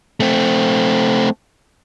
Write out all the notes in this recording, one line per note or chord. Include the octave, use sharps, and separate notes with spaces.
A3 C4